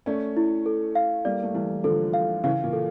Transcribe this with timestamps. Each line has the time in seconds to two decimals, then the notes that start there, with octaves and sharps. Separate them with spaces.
0.06 A3 C#4 D5
0.37 E4
0.66 A4
0.95 F5
1.25 G3 A#3 D5
1.43 A3
1.54 E3 G3 E4
1.84 D3 F3 A4
2.14 F5
2.44 C#3 E3 F5
2.64 A#2
2.73 A4